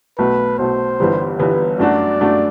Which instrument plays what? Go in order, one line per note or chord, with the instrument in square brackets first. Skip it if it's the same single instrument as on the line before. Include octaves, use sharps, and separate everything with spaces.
[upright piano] B1 B2 A3 [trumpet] B4
[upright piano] B1 B2 A3 [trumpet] C5
[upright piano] G1 G2 E3 G3 B3
G1 G2 E3 G3 B3
[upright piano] F#2 F#3 A3 D4 F#4 [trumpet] D5
[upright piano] F#2 F#3 A3 D4 F#4